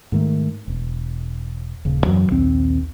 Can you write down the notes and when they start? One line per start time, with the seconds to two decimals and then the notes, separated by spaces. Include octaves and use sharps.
0.12 G#2 D#3 A3
0.68 E1
1.85 D#1 C#3
2.05 F#2 E3 F#3
2.29 A#1 D#2 C4